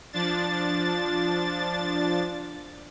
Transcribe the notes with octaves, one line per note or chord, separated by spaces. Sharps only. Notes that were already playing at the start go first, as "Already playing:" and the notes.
F3 D4 A6